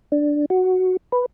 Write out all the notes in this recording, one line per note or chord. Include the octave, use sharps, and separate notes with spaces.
D4
F#4
B4